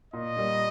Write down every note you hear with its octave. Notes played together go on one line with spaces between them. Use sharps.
A#2 D#5
G3 A#3